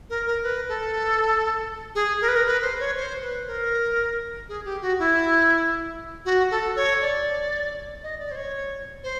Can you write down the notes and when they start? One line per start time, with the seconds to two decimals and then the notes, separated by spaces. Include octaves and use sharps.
0.10 A#4
0.26 A#4
0.43 B4
0.69 A4
1.95 G#4
2.21 A#4
2.28 B4
2.36 A#4
2.46 B4
2.62 C5
2.80 C#5
2.96 C5
3.22 B4
3.47 A#4
4.49 G#4
4.65 G4
4.82 F#4
4.99 E4
6.25 F#4
6.51 A4
6.76 C#5
7.01 D5
8.03 D#5
8.20 D5
8.31 C5
8.36 C#5
9.04 C5